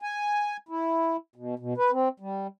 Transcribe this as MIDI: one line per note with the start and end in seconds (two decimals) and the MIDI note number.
0.02 0.57 80
0.69 1.16 64
1.36 1.54 47
1.59 1.74 47
1.77 1.91 71
1.92 2.09 60
2.20 2.47 55